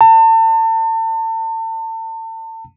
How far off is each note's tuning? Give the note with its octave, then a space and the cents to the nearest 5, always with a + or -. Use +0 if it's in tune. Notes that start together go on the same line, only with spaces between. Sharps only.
A5 +35